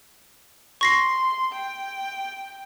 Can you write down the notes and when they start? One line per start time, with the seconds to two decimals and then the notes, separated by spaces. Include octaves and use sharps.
0.81 C6 C#6 A#6 C7
1.53 G5